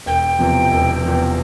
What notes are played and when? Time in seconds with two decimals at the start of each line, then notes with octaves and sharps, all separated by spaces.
0.06 E1 G5
0.39 E2 C3 F3
0.71 E1
1.03 E2 C3 F3